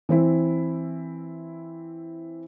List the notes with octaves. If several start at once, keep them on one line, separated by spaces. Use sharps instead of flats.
E3 C4 E4